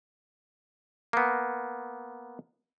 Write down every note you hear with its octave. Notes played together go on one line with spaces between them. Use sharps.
A#3 B3